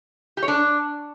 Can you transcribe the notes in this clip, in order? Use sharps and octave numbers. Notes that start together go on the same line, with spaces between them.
G4
C#5
D4